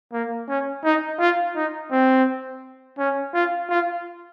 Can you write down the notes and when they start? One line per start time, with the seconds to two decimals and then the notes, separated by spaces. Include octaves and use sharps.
0.13 A#3
0.48 C#4
0.84 D#4
1.19 F4
1.55 D#4
1.91 C4
2.98 C#4
3.34 F4
3.70 F4